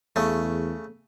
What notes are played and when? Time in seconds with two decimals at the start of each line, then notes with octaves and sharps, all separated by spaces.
0.16 E2 C#3 A3